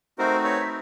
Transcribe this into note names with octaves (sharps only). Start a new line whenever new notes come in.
A3 C4 D#4 F#4 A#4 C5
B4 C#5
E5